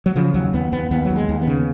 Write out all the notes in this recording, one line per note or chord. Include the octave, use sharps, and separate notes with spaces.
F#3
C#3 F3
D#2 F#3
D#2 B3
D#2 B3
D#2 B3
F#3
D#2
G#3
D#2
B3
C#3